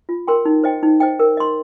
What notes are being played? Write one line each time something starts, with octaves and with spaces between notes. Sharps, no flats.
F4
A#4 G5 C6
D#4
C5 D#5 G5
D#4
C5 D#5 G5
A#4
D#5 C6